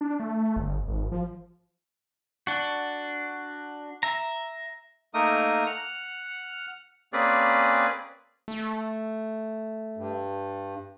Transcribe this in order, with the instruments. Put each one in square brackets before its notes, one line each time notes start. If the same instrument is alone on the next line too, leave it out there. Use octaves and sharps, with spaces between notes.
[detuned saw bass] D4
A3
G1
G#1
F3
[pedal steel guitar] D4 F#4
E5 A#5
[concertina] A3 A#3 D#4 A#4 D#6
F#5 F6
A#3 C4 C#4 G#4 B4 D5
[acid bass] A3
[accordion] G2